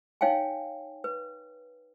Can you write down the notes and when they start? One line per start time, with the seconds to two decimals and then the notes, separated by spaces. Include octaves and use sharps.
0.21 D#4 C#5 F5 G5 G#5
1.04 B4